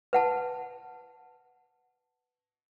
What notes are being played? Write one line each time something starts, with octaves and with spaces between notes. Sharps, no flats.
B4 F#5 A5